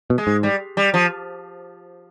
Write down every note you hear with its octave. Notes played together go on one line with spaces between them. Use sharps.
B2
G#3
G#2
G3
G3
F3